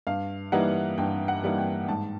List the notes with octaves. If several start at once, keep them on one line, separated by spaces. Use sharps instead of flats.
G2 F5
E3 G3 A#3 D#4 F#5
G2 G5
F#5
E3 G3 A#3 D#4
G5
G#2 A5